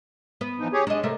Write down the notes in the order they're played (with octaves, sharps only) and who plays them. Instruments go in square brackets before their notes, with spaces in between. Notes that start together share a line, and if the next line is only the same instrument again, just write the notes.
[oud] B3
[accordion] E3 F3 D#4
G4 G#4 C#5
[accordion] G#3 [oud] D4 D#5
[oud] C3 A3 A#4